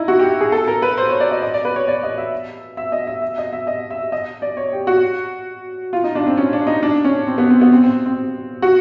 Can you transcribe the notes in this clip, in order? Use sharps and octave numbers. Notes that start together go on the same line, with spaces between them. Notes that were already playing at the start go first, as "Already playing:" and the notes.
Already playing: D#4 E4
F#4
G4
G#4
A4
A#4
B4
C5
C#5
D5
D#5
D#5
D5
B4
C#5
D5
D#5
E5
E5
D#5
E5
E5
D#5
E5
D#5
E5
D#5
D5
C#5
G4
F#4
F4
D#4
D4
C4
C#4
D4
D#4
D4
C#4
C4
B3
C4
B3
C4
C4
C4
F#4